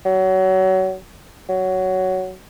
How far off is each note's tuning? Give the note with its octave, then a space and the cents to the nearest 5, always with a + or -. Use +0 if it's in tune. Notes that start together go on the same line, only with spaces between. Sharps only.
F#3 +25
F#3 +10